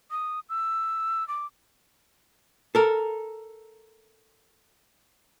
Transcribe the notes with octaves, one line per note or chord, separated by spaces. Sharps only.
D#6
E6
D6
A4 A#4